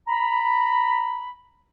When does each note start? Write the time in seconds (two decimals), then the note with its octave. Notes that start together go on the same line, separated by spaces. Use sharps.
0.07 A#5 B5